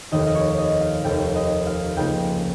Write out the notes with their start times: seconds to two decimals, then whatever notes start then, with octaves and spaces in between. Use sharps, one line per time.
0.12 F1 D#2 D#3 D#5
0.19 F5
0.27 D#5
0.35 C#5
0.58 D#5
0.81 F5
1.04 F1 D#2 D#3 G5
1.35 D#5
1.66 F5
1.96 C#2 C#3 F3 A#3 D#4 G5